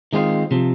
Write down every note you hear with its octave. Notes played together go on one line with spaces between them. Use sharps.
D#3 G#3 C4 F4
C3 F3